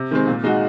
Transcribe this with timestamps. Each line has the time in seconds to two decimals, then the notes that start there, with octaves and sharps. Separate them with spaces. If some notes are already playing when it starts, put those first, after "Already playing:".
Already playing: C3
0.11 D#3 G#3 C4
0.27 A#2
0.44 G#3 D#4 F#4